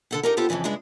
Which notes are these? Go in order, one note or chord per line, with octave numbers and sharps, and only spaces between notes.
D3 A4 F#5
D#4 G4 A#4
B3 F4 G4 A4 C5
F2 A#2 C#3 E3 F3
G2 C#3 G#3 D4 E4